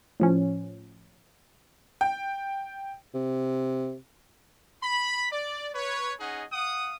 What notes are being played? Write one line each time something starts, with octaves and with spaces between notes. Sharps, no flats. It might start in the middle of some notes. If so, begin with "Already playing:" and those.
A2 F3 C#4
G5
C3
B5
D5
B4 C#5
C#4 D#4 G#4 D#5 F#5
F5 F#5 D#6